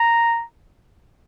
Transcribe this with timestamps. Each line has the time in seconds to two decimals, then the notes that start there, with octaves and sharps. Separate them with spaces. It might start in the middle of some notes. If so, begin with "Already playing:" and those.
Already playing: A#5